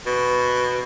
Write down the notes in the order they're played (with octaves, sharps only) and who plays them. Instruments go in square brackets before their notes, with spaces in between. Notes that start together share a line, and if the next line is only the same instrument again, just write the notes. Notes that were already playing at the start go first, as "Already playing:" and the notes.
[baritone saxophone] B2